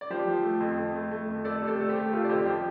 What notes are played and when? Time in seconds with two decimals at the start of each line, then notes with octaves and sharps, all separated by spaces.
0.01 D5
0.10 F3 G4 C5
0.27 F3
0.43 A3
0.60 F2
0.78 F2
0.94 A3
1.11 A3
1.28 F2
1.44 A3 A4 D5
1.62 C3
1.67 A4 D5
1.79 A3
1.89 G4 C5
1.96 A3
2.12 C3 F4 A4
2.25 D5
2.29 F2 G4 C5
2.46 F3 G4 C5